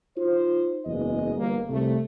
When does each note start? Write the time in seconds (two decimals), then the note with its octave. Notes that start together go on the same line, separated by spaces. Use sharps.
0.16 D#4 F4 C5
0.85 F#1 E2 G#3 D#5
1.36 G1 A#3
1.69 C2 C3 A3